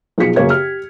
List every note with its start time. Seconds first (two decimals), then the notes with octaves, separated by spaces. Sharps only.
0.18 B1 F3 G#4 B6 C#7
0.36 F#2 C#3 A#3 G#4 C#5 G#6
0.50 G4 F6